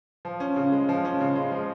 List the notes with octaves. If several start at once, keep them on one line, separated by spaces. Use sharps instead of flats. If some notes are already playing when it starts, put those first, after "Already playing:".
F3
C#4
C#3
G#3
F3
C#4
C#3
G#3
F3